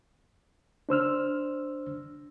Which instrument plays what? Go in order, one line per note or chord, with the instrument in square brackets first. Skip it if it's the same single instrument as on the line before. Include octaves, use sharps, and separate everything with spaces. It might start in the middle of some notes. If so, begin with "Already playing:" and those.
[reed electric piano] D4 C5 E6 F6